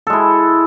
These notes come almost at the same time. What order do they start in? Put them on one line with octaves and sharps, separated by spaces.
A4 G#3 E4